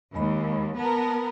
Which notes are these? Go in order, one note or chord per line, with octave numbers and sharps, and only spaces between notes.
D#2 G#3 D#5 B5
B3 A#4 A5